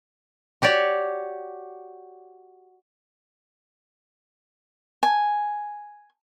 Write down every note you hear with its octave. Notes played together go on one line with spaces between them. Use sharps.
F#4 G4 C#5 D5
G#5